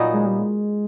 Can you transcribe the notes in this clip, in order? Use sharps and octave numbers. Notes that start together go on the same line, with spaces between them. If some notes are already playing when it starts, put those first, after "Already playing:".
Already playing: A#2 F#3 B3 D#4
G#3
G3
G#3